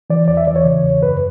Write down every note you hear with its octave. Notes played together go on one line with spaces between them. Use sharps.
E3 D5
E2 D5
E5
E3 D5
C#5
C#3
E2
F#2 B4